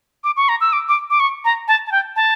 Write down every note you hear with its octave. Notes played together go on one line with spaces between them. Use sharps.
D6
C#6
A#5
E6
D6
D6
D6
C#6
A#5
A5
A5
G5
A5